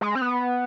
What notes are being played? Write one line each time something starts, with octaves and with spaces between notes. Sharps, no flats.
G#3
C4
B3